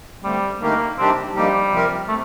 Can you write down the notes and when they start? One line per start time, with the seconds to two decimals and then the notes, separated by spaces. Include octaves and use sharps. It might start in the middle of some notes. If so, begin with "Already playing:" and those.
0.23 D3 G3 A3 C4
0.60 D3 A3 A#3 D#4 G4 A#4
0.98 C3 D#3 G3 C4 D4 G4
1.35 D3 F3 G3 A#3 D#4 G4
1.72 C3 F3 C4 G4 A#4
2.09 C3 A3